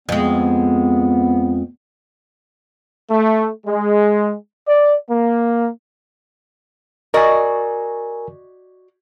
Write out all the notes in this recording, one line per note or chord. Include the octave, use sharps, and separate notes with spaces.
F2 G#3 B3
A3
G#3
D5
A#3
F#4 A#4 D5 D#5 G#5